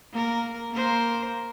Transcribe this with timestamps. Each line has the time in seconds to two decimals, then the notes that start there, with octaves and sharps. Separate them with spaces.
0.13 A#3 A#4
0.72 A#3 A#4 C5